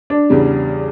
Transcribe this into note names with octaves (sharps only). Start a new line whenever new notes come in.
D4
E2 C#3 G3